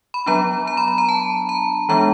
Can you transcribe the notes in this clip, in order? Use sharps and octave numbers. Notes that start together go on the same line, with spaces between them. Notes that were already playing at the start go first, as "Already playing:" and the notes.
B5
F#3 B3 D4 A#5
A#5
B5
B5
A#5
A5
A#5
E3 G#3 B3 D4 A#5